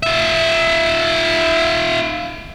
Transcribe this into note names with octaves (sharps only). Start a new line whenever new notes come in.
F4 E5